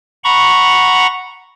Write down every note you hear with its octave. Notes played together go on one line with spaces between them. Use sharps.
F#5 A#5 B5 C#6